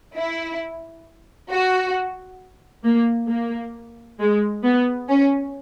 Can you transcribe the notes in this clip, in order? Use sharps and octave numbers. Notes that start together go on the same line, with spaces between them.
E4
F#4
A#3
A#3
G#3
B3
C#4